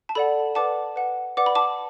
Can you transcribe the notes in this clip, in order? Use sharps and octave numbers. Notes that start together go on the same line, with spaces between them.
A5
A4 D5 F#5 B5
B4 D5 F#5 A5 D6
B4 F#5
B4 D5 F#5 D6
B5
A5 D6